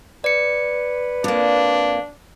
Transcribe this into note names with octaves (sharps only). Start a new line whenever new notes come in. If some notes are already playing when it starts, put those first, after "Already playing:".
B4 D5 C#7
F2 A#3 D4